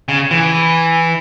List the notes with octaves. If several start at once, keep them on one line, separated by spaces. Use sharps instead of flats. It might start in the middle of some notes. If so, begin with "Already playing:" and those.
C#3
E3